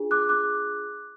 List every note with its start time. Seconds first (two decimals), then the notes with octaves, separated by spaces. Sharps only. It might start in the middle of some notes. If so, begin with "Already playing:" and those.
Already playing: D4 F4 G#4
0.11 D6 F#6
0.29 D6 F#6